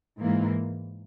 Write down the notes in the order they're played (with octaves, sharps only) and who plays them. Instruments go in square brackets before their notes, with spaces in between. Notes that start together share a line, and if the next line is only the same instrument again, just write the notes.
[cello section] G#2 E3 A#3